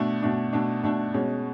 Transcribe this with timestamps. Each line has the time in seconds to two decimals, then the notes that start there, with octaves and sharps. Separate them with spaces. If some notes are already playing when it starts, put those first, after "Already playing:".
Already playing: B2 A3 D4
0.23 B2 A3 D4
0.53 B2 A3 D4
0.84 B2 A3 D4
1.14 B2 G#3 C#4